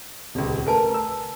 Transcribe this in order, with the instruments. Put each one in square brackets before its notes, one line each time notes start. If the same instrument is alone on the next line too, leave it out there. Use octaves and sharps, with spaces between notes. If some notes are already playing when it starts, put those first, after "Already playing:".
[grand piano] D#1 C#2
[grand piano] A3 A#4 [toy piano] B4 G#5 A5
[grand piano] E6